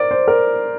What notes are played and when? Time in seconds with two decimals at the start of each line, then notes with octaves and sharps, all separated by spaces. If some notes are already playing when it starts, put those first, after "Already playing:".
Already playing: A#4 C5 D5
0.11 C5
0.28 A#4